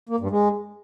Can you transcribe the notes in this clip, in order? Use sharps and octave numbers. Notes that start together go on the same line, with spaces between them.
A#3
G2
G#3